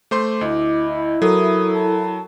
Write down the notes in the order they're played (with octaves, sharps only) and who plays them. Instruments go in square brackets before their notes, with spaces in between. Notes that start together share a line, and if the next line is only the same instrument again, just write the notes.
[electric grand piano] A3 C5 C6 [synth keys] D6
[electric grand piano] D2 [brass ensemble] E4 [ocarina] D#5
[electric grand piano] F#3 [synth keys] A4 A#4 [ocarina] D#6
[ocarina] A5